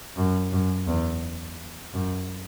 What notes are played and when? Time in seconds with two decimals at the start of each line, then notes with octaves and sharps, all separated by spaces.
0.17 F#2
0.53 F#2
0.87 E2
1.94 F#2